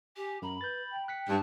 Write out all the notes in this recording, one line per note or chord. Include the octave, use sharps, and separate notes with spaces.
G4 G#5
F#2 A#5 B5
B4 G6 A6
G5
F#6 B6 C#7
G2 A5